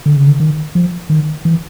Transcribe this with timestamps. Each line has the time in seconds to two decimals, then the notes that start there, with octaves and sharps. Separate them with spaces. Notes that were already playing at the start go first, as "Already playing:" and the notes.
0.06 D3
0.16 C#3
0.27 D3
0.40 D#3
0.75 F3
1.10 D#3
1.45 E3